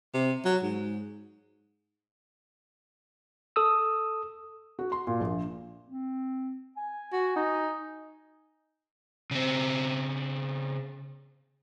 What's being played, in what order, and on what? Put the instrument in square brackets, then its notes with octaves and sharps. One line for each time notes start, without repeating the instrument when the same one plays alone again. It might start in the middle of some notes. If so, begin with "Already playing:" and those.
[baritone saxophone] C3
F#3
G#2
[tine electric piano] A4 D#6 E6
[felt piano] F#4
C6
A#2
A#1
[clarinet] C4
G#5
[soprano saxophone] F#4
D#4
[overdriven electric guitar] C#3 C4